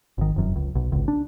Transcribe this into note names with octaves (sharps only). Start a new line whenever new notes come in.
G#1 D#3
F1 F#2
C#2
B1
G#1 C#2
D4